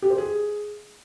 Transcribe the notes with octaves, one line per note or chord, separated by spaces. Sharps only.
G4
C5
G#4